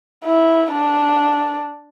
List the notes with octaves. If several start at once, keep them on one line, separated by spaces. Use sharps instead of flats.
E4
D4